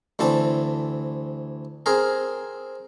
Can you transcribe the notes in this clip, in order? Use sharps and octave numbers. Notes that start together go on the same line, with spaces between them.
D2 E3 C4 A5
C4 G#4 A#4